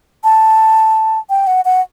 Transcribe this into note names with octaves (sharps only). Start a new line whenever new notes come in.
A5
G5
F#5
F#5